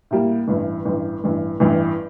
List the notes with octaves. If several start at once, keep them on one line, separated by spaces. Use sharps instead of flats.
A2 G3 A#3
A1 G2 E3
A1 G2 E3
A1 G2 E3
A1 G2 E3